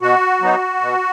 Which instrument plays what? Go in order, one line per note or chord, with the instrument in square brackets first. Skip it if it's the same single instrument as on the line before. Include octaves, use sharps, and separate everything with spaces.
[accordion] B2 F#4
F#3 B3 D#4
B2